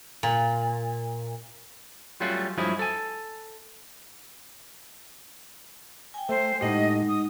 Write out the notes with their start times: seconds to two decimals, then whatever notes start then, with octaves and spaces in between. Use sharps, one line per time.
0.23 A#2
2.20 F#3 G3 A3 C#4 F4 F#4
2.57 G2 F3 F#3 G#3 E4 G#4
2.79 A4 G#5
6.14 G5 G#5
6.29 A3 C5
6.61 A2 G#3 D#4 G4 D#5 F#5
7.08 D#6